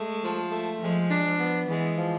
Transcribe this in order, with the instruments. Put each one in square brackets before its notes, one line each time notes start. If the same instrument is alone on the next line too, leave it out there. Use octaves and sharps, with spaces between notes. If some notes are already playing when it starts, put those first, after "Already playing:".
Already playing: [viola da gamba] G#3 [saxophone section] A3
[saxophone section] F3
A3
[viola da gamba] F3 [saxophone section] G#3
[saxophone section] D4
[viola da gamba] F3
[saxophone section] B3
[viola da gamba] E3 [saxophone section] G#3
[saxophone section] F3